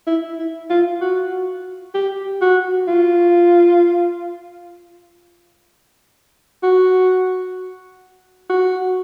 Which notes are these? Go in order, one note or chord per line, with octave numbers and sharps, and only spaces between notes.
E4
E4
F4
F#4
G4
F#4
F4
F#4
F#4